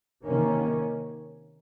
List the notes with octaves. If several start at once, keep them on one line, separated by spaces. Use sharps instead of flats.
C3 D#3 A#3 C#4